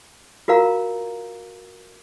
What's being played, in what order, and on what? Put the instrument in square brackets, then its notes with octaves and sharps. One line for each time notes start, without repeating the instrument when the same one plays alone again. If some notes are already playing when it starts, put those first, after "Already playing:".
[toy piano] F4 F#4 A#4 F5 A#5